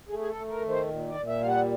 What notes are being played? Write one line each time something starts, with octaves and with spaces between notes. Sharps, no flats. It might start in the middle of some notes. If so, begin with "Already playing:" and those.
A3 G#4
G#4
A4
A3
A#4
D#3
C5
A#2
D5
A#2
E5
G3 F5
F#5